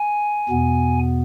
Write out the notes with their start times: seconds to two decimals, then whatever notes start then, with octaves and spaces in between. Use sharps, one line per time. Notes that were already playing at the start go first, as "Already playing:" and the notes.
Already playing: G#5
0.49 E2 B2 B3